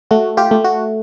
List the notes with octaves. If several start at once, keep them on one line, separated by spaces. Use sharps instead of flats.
A3 F#4
F4 G4
A3
F#4